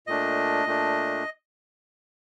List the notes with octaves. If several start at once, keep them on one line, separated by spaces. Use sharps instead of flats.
A#2 A3 D4 D#5
A#2 A3 D4